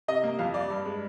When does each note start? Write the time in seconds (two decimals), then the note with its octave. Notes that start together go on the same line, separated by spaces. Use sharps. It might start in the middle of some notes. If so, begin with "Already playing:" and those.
0.08 C3 D#5
0.24 A#3
0.39 F2 F5
0.54 G3 D5
0.70 G2
0.85 G#3